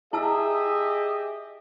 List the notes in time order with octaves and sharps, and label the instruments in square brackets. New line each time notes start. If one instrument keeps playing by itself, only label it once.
[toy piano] E4 A5 E6 [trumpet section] G4 D#5 E5 [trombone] G#4